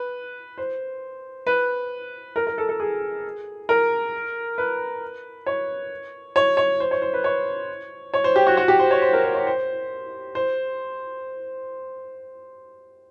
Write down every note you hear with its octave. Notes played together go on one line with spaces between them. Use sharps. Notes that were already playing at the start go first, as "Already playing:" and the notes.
Already playing: B4
C5
B4
A#4
A#4
A4
A4
G#4
A#4
B4
C#5
C#5
C#5
C5
C#5
C5
B4
C#5
C#5
C5
G4
F#4
F#4
G4
C5
C#5
C5
A#4
C5
C#5
C5
C5